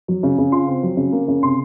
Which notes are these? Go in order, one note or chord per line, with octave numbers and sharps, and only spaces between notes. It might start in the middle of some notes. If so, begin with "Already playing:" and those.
F#3
C#3
C#3
F4 C6
C4
F#3
C#3
A#3
C#3
C3 C6